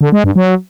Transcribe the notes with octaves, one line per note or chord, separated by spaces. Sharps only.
D3
G#3
G2
F#3